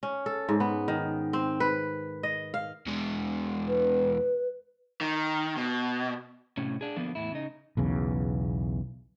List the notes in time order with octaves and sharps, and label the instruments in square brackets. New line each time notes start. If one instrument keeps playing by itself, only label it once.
[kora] C#4
A4
G#2
B3
D#3
C4
B4
D#5
F5
[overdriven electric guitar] E2 G#3
[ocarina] B4
[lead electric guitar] D#3
B2
[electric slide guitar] A2 C3 C#4
D4 G#4
D3 F3 A#3 B3
E2 A2 E4
C#3 D#4
[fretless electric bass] B1 E2 C#3